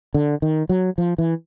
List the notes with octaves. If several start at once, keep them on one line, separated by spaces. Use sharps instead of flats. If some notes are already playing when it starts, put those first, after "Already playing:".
D3
D#3
F#3
F3
E3